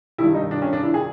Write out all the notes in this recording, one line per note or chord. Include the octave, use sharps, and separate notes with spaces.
G2 D#3 E4
D#4
D4
C#4
D4
E4
G#4